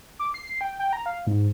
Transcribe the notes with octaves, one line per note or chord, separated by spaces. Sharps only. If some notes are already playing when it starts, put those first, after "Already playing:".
D6
C7
G5
G5
A#5
F5
G#2